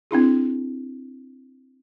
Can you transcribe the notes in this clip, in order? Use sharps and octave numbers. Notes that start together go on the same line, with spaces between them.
C4 D4 E4 G#4